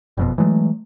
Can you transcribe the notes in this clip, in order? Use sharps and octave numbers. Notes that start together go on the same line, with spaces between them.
F#1 F2 B2
E3 F#3 G#3 A3